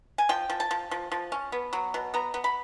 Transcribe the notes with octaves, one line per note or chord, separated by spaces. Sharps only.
G#5
F3 G5
F3
A5
F3
F3
F3
C#4
B3
F#3
B2
B3 A#5
B3
B5